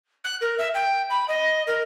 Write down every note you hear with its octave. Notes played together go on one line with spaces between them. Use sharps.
F#6
A#4
E5
G5
B5
D#5
A#4